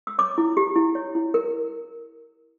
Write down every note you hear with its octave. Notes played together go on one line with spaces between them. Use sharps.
E6
C#5 D6
E4
G4
E4
C#5
E4
A#4